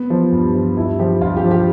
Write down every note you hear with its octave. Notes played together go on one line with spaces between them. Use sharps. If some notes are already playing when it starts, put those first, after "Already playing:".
Already playing: B3
F3
G2
F3
G2 E4
F3 G4
G2 F4
G4
F3
G4